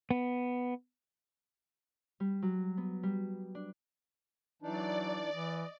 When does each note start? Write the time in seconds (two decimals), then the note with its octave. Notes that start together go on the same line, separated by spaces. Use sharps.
0.11 B3
2.20 G3
2.42 F#3
2.77 B3
3.03 G3
3.55 D4
4.62 E3 F#3 D4 D#4 D5
5.31 E3 D#5